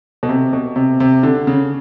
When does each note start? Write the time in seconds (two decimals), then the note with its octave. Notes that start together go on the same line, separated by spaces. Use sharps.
0.23 B2
0.29 C3
0.53 B2
0.76 C3
1.00 C3
1.23 D3
1.47 C#3